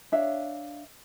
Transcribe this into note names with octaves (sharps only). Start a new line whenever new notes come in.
D4 C#5 E5 F5